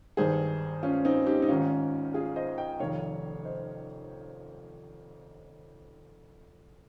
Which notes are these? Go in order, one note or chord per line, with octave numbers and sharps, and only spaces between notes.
G#1 G2 D#3 G#4 C5
C#4 F4
C4 D#4
D#4 G4
D#4
G#1 G#2 D#3 C#4 F4
F4 G#4
C5 D#5
D#5 G5
F1 F2 D#3 C#5 F5
C5 D#5